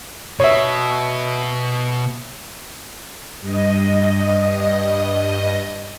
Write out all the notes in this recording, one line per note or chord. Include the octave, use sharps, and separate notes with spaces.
B2 C#5 E5
G2 D#5